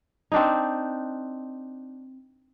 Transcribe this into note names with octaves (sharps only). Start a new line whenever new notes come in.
C4 D4 D#4